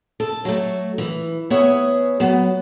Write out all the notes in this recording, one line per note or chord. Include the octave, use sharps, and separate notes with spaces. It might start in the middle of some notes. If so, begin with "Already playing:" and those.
A4
F#3 A3
E3
B3 G#4 C#5 E5
F#3 B3